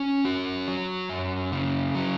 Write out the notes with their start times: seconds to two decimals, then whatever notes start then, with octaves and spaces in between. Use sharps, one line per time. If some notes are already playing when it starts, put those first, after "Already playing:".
Already playing: C#4 C#5
0.25 F#4
0.68 F#3
1.10 F#2
1.52 C#3
1.95 F#3